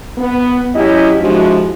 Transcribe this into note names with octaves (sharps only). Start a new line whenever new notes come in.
B3
F#3 C#4 E4 G4 D#5
F3 G#3 D4 E4 F#4 G4